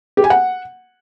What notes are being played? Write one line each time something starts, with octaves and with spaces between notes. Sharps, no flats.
G4
G#5
F#5